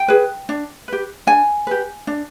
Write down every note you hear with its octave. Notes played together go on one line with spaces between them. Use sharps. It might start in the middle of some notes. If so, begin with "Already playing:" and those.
Already playing: G5
G#4 B4
D4
G4 B4
D4 G#5
G4 B4
D4